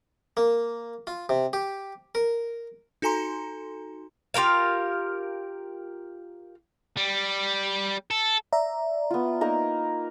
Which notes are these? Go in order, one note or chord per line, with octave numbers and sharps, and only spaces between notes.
A#3
F4
C3
G4
A#4
D#4 F#4 A4 G#5 A#5 C6
F4 G4 A#4 F5
G3
A4
D5 E5 A#5
B3 F4
A#3 D#4 A#4